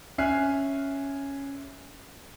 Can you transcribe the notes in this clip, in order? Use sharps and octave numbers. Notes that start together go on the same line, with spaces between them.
C#4 E5 G#5 F6 F#6 C7